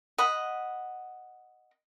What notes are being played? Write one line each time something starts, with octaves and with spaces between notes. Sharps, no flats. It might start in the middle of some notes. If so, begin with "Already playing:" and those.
D#5 F#5 B5